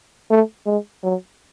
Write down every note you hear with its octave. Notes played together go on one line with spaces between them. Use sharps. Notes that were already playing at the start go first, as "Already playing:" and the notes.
A3
G#3
F#3